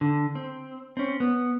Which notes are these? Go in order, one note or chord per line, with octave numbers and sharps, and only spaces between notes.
D3
C4
C4 C#4
B3